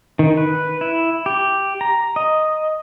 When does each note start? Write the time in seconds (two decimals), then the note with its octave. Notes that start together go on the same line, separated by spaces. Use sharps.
0.19 D#3
0.37 B4
0.81 E4
1.26 G4
1.81 A#5
2.16 D#5